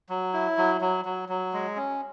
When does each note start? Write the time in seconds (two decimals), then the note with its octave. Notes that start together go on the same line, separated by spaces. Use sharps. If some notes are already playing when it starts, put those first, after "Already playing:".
0.09 F#3
0.33 E4
0.58 F#3
0.81 F#3
1.05 F#3
1.29 F#3
1.53 G#3
1.76 C#4